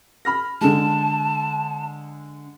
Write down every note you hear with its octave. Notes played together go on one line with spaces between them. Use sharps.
B5 F6 A#6
D3 G#3 A5